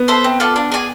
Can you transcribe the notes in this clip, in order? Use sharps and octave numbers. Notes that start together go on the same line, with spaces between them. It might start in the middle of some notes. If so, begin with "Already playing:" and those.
Already playing: B3
A4 C5 E5
C4
F4 A4 D5
D4
G#4 D5 G#5